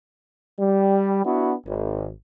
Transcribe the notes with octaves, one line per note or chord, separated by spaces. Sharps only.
G3
B3 D4 E4 F#4
G#1